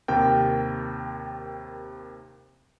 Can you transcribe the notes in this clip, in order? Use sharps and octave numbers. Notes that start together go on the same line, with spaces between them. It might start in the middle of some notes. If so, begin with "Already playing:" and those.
D#2 C3 A#4 G5